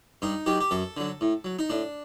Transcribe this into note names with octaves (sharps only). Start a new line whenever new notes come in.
G2 D#4
D#3 F#3 G4
G4
F#2 A4
D3 F#3
A2
F#3
D#4
A2 D4